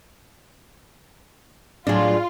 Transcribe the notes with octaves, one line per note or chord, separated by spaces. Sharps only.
A2 F#3 D4 F4 G#4